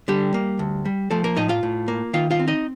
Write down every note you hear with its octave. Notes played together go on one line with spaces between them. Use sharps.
D3 G3 G4
A#3
D2
G3
F3 A3 A4
A#3 A#4
A2 D#4 D#5
F4 F5
A2
A#3
D#3 F4 F5
F4 F5
C4
D#4 D#5